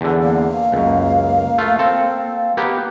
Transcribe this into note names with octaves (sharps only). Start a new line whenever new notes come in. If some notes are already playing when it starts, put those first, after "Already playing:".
E2 D3
A#3 F5
C#2 F#2
A3 F4
C4 A4
A#3 B3 G4